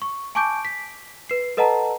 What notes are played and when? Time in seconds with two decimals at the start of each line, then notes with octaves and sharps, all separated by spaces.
0.02 C#6
0.35 G#5 A5 C#6 D6 G6 D7
0.65 B6
1.29 B4 C7
1.57 A4 B4 D#5 F#5 A5 A#5